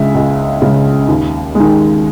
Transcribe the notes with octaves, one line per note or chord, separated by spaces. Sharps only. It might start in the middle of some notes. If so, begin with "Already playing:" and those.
Already playing: C#2 C#3 G#3 E5
C#2
C#3 G#3
D#2
D#3 G#3